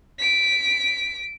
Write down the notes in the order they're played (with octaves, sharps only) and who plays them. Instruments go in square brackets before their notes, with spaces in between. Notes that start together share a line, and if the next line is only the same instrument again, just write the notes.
[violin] B6 D7